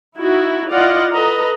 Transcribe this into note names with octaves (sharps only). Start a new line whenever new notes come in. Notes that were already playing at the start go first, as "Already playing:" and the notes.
D#4 E4 F#4
E4 F4 D5 D#5 F5 F#5
A4 B4 D#5 A#5